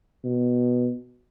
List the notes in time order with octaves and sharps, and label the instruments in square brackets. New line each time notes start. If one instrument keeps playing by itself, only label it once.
[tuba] B2